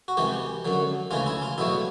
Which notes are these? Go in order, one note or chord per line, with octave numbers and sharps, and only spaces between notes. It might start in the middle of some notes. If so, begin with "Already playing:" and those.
F#4
C2 C3 E3 G#3 G4
F#2 D3 F#3
D2 C#3 E3 G#3 F4
E4
F4
E2 B2 F#3 A3 E4